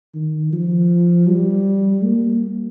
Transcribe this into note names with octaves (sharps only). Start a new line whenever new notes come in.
D#3
F3
G3
A#3